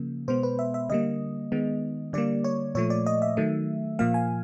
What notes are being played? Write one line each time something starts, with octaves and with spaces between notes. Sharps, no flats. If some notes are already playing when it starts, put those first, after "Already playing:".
Already playing: C#3 F3 A#3
B2 G#3 B3 C5
B4
E5
E5
D3 G3 A#3 D#5
D#3 G#3 B3
D3 G3 A#3 D5
C#5
A#2 F3 A3 C#5
D5
D#5
E5
D#3 F#3 A3
A#2 F3 A#3 F5
G#5